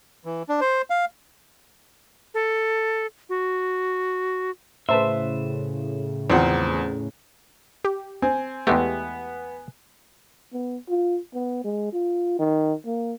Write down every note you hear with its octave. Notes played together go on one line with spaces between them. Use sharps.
E3
D4
C5
F5
A4
F#4
A2 C#3 B4 C5 E5 A5 C6
E2 D#3 F3 C4 F#5
G4
C4 G#5
E2 G#3 A3 B3 G4
B3
F4
B3
G#3
F4
D#3
A#3